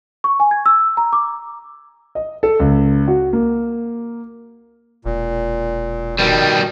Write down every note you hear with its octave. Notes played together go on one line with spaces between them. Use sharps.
C#6
G#5
G#6
E6
A#5
D6
D#5
A4
C#2
F#4
A#3
E1 A#2
B2 D#3 G3